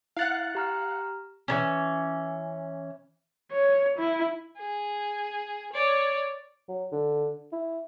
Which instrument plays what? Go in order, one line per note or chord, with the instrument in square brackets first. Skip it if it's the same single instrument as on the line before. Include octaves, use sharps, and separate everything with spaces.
[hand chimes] E4 A6 [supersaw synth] F5 F#5 F#6
[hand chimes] G4 A#5 F6
[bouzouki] E3 B3 C#4
[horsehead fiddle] C#5
E4
[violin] G#4
C#5 D5
[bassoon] F#3
D3
E4